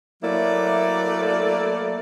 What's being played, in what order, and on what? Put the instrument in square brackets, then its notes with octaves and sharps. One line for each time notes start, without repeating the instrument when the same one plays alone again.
[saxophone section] F#3 A3 A#3 E4 D5